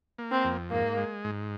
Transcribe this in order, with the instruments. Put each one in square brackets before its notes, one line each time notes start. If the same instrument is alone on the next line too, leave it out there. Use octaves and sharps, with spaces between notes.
[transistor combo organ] A#3
[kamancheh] C4
[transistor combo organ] F2
[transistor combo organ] G#2 [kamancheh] A#3
[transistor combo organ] G#3
G#2